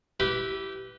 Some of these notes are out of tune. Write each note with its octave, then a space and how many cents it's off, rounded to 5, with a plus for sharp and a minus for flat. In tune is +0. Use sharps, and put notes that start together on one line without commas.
E4 +0 G4 -20 B4 +0